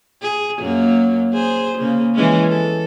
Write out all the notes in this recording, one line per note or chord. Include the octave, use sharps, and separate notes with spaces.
G#4
F#2 F#3 A#3
G#4 C5
C#3 A#3
E3 G#3 C#4
A4